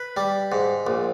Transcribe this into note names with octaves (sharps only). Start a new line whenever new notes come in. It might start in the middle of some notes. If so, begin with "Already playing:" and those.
Already playing: B4
G3
G#2
A#1